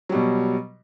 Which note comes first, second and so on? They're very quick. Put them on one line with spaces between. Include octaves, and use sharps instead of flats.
F#3 G3 B2